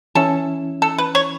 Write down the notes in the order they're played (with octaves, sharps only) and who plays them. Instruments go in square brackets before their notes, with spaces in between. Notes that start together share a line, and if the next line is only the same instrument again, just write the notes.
[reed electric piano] E3 C#4 E4 [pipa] A4
[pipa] A4
B4
C#5